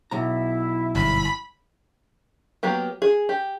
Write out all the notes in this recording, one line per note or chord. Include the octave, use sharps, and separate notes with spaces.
B1 E4 A#5
G1 F#2 B5
F#3 A#3 B3 G4
G#4
G4